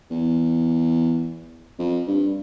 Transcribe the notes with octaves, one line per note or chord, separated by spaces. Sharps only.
E2
F2
G2